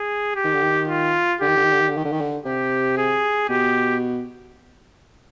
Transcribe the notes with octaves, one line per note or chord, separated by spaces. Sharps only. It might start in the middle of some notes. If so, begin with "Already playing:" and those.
Already playing: G#4
G4
D#3
D3
D#3
F4
D3 G4
D#3
D3
D#3
D3
D#3
D3
D#3
D3
D#3
D3
C3 G4
G#4
B2 G4